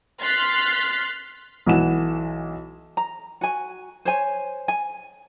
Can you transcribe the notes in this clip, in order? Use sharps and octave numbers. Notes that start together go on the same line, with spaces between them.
C6 F6 F#6 A6 B6 C7
B1 E3 F#5 E7
A#5
F#4 G#5
C5 C#5 G#5
G#5